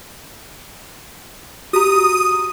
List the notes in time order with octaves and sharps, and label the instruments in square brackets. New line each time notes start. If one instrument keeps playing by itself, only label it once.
[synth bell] F#4 G4 A#5 [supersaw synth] D#6